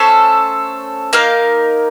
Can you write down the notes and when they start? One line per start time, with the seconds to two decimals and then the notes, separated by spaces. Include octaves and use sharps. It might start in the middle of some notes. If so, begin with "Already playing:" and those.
Already playing: A3 C#4 A4 C5
1.13 A#3 D#4 A#4 F5